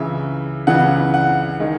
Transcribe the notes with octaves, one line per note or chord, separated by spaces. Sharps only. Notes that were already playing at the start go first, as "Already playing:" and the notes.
Already playing: C#2 C#3 E3 E5
C#2 C#3 E3 F#5
F#5
D#3 G#3